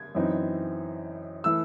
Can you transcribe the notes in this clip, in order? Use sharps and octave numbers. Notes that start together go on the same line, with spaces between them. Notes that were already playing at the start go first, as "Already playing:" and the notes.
Already playing: G#6
F#2 E3 C4 D#4
E3 A3 E6